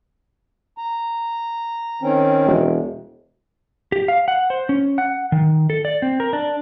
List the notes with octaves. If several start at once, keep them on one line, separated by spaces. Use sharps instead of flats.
A#5
D#3 C4 C#4
E1
G4
F5
F#5
C5
C#4
F#5
D#3
A4
D5
C4
A#4
D4